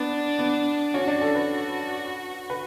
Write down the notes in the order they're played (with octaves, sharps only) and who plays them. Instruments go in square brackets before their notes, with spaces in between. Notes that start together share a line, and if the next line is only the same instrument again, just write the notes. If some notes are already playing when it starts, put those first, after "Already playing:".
Already playing: [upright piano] B3 [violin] D4
[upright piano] B3
[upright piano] C#4 [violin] F#4
[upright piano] D4
A4
B4
B4